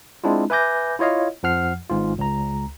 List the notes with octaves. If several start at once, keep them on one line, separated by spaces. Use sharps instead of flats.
G#3 C4 D4 E4 F4
B4 E5 G#5 D6 G6 A#6
E4 F4 C#5 D#5 F5
F2 F3 F#5 F6 C7
G#1 G#2 F4
C#2 A#5